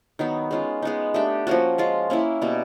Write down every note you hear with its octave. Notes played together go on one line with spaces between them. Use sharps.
D#3 F#3 B3 D#4
G#3 C#4 F4
G#3 B3 D#4
A3 D4 G4
F3 A#3 C#4 F#4
G#3 C#4 F4
A#3 C#4 E4
B2 G3 A#3